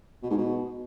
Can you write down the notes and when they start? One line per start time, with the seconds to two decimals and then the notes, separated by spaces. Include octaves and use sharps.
0.23 B2
0.30 G#2
0.38 B2